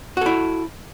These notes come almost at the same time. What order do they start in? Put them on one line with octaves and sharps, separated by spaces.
F#4 A4 E4